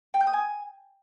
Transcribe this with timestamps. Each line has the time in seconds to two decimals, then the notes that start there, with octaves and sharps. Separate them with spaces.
0.14 G5
0.20 G6
0.27 D#6
0.33 G#5